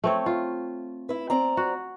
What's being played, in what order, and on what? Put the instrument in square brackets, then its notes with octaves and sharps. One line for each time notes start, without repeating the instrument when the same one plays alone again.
[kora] A3 C4 C#5
F4
[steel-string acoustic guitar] E4 B4
C4 D5 A#5
[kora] F#4